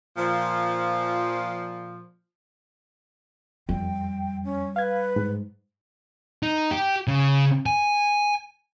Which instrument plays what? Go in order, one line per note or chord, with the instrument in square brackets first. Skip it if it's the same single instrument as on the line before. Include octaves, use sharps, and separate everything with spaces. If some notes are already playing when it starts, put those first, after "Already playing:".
[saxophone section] A#2 F3
[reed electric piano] F2 [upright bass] G3 [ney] G5
[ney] C#4
[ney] B4 [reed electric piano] F5 G#6
[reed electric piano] G#2
[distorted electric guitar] D#4
G4
C#3
G#5